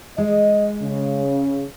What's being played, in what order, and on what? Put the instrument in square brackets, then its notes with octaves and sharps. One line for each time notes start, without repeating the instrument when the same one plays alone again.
[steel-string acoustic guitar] G#3 [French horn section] D#5
[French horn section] C#3